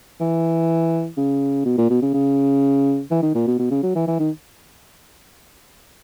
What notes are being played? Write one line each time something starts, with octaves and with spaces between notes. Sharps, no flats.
E3
C#3
B2
A#2
B2
C#3
C#3
E3
D#3
A#2
B2
B2
C#3
F#3
E3
E3
D#3